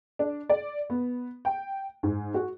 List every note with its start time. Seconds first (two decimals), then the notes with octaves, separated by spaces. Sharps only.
0.19 D4
0.49 D5
0.90 B3
1.45 G5
2.03 G#2
2.34 F#4